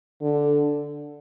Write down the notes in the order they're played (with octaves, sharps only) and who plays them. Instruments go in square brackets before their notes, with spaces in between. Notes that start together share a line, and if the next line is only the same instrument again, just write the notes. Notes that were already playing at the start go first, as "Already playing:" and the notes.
[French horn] D3